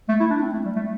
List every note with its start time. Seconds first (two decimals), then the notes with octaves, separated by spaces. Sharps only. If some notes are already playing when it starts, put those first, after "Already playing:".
0.08 A3
0.20 E4
0.30 D4
0.41 C4
0.53 A3
0.65 G3
0.76 A3